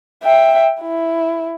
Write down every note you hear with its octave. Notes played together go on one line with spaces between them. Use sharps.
E5 G5
E4